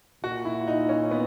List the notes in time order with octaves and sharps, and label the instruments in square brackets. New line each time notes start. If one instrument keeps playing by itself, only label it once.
[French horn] A#2 [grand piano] F#4
[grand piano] E4
D#4
C#4
B3